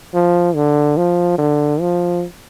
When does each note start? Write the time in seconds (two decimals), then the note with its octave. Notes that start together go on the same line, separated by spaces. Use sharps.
0.14 F3
0.55 D3
0.97 F3
1.39 D3
1.81 F3